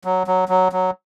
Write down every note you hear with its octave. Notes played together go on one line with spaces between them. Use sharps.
F#3
F#3
F#3
F#3